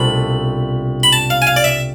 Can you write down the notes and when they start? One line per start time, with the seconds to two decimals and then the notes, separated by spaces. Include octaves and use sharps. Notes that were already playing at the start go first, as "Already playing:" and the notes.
Already playing: C2 B2 A3 D4 F4 B5
1.03 B5
1.13 A5
1.30 F5
1.42 G#5
1.47 F5
1.56 D5
1.64 E5